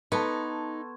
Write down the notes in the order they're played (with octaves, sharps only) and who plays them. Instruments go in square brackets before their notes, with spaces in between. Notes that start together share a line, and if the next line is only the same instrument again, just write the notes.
[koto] B3 [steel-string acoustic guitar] D#4 [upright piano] A4 A5 [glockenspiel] C6 C#6 G#6